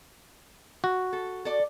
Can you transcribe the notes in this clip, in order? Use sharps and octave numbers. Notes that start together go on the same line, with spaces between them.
F#4
A4
A4 D5